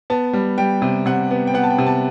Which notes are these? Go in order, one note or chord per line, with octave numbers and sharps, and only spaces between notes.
B3 A5
G3
G3 G5
C3
C3 F#5
B3
G5
B3 F#5
A5
G5
C3
A5